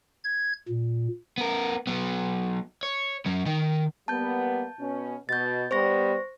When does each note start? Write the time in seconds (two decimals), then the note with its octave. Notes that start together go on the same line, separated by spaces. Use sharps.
0.24 G#6
0.69 A#2
1.38 B3 A#4
1.87 F#3 B3
2.83 C#5
3.26 F#3 C#4
3.46 D#3 D#4
4.08 G3 A#3 B3 A5 G6
4.79 B2 B3 C#4
5.29 B2 G6 A6
5.71 G3 B3 C5 C#6 A#6